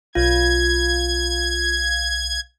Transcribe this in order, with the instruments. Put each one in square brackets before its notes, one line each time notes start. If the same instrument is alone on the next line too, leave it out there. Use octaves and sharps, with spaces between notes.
[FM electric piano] B1 F5 [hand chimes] F4 [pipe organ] G#6